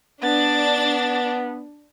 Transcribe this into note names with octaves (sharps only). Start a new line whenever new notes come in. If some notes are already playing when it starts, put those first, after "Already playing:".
B3 D4 A6